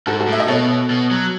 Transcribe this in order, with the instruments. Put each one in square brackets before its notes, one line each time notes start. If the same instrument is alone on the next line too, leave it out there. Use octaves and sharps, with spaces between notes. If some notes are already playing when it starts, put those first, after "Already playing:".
[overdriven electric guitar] G#2 [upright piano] F#4 A4
[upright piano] F#4 A4
[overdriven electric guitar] A2
[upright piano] E5
D#5
[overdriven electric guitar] B2 [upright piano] A4 C#5
[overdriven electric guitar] B2
F#3